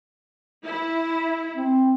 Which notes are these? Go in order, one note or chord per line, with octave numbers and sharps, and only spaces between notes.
E4
C4